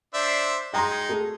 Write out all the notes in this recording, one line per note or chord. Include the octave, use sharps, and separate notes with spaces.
D4 C5 E5
G#3 D#4 G5 A#5 C6
A3 G#4